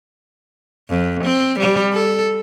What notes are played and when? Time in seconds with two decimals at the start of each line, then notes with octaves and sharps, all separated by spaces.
0.90 F2
1.24 C4
1.59 G3
1.93 A4